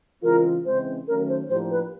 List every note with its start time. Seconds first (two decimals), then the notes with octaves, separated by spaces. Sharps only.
0.23 C#3 E3 G#3 C4 F4 A#4
0.65 C#3 E3 G#3 C4 C5
1.08 D#3 F#3 A3 C#4 A#4
1.29 C5
1.50 A2 F3 A#3 D4 G4 C5
1.71 B4